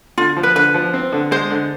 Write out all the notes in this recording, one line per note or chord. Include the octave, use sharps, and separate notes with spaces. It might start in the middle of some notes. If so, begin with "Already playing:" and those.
D3 F4
F3
B4
D3 B4
F3
C4
D3
G#3 C5
D3